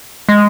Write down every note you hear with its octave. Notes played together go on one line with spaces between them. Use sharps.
G#3